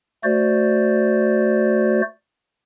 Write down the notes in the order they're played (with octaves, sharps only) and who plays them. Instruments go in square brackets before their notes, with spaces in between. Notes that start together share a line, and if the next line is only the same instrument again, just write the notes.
[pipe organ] A3 F#4 C5 D5